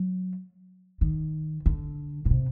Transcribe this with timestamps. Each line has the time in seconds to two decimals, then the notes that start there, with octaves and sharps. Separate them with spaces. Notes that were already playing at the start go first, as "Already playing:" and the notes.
Already playing: F#3
1.01 D#3
1.66 D3
2.25 B2
2.30 C3